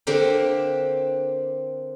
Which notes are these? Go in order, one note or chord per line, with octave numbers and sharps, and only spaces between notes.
D3 A#3 C4 G4